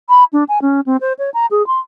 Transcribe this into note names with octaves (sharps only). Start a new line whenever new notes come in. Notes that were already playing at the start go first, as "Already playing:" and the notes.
B5
D4
G#5
C#4
C4
C5
C#5
A#5
G#4
C6